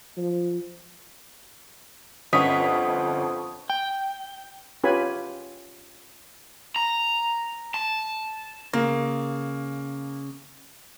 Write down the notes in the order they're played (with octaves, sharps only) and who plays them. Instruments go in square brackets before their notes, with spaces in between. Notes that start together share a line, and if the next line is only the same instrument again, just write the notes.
[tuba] F3
[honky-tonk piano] G1 C#4 B6 [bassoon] F2 [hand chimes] D#5 F#5 [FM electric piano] C#6 D#6
[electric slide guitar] G5
[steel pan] C#4 F4 G4 B4 G#5 B5
[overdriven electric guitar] A#5
A5
[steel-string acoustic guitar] C#3 [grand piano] A#3